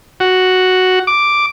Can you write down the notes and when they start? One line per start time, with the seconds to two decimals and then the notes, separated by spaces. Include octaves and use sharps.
0.20 F#4
1.07 D6